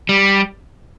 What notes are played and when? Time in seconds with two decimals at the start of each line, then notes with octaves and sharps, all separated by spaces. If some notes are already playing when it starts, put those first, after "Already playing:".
0.09 G3